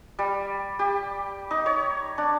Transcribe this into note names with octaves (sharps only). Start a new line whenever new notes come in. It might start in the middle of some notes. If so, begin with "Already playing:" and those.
G3
G4
D#4
C#5
D4